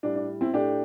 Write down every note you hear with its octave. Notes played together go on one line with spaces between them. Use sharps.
A2 G3 D4
D4
C4 E4
A2 A3 D4 G4